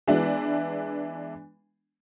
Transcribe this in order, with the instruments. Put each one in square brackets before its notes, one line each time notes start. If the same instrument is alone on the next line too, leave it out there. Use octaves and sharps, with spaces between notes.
[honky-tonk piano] E3 G#3 B3 D4 E4